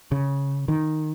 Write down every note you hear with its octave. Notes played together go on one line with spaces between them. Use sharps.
C#3
D#3